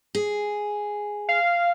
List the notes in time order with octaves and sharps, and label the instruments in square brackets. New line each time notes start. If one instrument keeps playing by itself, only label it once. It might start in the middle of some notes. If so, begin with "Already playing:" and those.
[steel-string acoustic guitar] G#4
[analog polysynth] F5